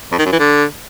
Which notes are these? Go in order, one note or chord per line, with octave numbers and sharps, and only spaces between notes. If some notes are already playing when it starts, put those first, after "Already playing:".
F2
D#3
F#2
E3
D3